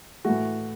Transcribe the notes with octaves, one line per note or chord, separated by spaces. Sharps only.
A2 E3 A3 F#4